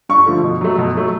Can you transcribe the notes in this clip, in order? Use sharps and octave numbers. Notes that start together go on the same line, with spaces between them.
G2 C#6
D3 F3 A3
B2
F#3 A3
B2
F#3 A3